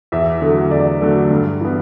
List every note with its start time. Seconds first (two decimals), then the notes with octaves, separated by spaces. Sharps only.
0.12 E2 E5
0.42 D3 F#3 A3
0.71 E2 D5
1.01 D3 F#3 A3
1.30 G2
1.60 E3 B3